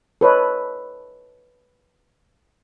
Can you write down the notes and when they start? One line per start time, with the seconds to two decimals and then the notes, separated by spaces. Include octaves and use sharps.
0.21 A4 B4 C#5 D#5